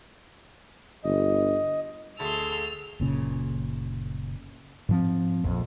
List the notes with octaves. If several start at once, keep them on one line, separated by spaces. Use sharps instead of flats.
G1 D#5
D2 A3 G#4 A5 C6 E6 F7
F#1 A#2 C#3
G#2 F3 C4
A#1 F2